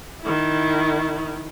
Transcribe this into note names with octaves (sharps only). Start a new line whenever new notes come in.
D#3 E4